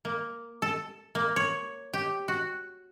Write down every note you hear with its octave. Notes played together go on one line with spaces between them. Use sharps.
A#3
A4
A#3
C#5
G4
F#4